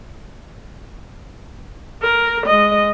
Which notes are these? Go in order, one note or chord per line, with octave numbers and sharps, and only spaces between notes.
A#4
G#3 D#5